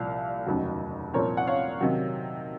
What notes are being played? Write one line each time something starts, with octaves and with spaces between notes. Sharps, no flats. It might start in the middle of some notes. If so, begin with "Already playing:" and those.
Already playing: C2 A#2 F3 F5
F1 D#2 C#3 F#3
C2 A#2 F3 C4 A#4 C#5
F#5
C#5 F5
C3 D#3 F#3